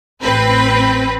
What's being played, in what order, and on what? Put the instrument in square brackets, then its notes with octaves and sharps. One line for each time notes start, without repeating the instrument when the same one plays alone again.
[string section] A1 C4 B4